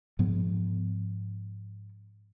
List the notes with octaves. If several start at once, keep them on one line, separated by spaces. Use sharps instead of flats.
G#2 F3 B3